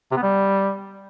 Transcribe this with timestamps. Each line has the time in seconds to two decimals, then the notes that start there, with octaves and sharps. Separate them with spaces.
0.11 C3
0.17 B3
0.22 G3